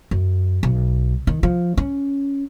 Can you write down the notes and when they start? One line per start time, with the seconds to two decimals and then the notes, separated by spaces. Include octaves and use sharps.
0.11 F#2
0.63 B1
1.27 D#3
1.43 F3
1.77 C#4